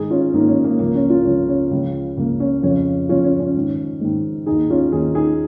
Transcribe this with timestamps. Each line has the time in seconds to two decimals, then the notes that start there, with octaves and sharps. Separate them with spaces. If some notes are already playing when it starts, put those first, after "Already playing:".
Already playing: G#2 D#3 D#4 G#4
0.10 C#4 F4
0.34 G#2 D#3 A#3 D#4
0.48 C#4
0.64 A#3
0.79 C#2 C#3 F3 A#3
0.95 C#4
1.10 C#4 F4
1.25 C#2 C#3 F3 C#4
1.49 C#4
1.71 C#2 C#3 F3
2.17 C#2 C#3 F3 A#3
2.40 C#4
2.62 F2 C#3 F3 C#4
3.09 F2 C#3 F3 C#4 F4
3.24 C#4
3.40 C#4
3.55 G#2 D#3
4.01 G#2 D#3
4.46 D#2 D#3 D#4 G#4
4.70 C#4 F4
4.92 D#2 D#3 D#4 G#4
5.15 D#4 G#4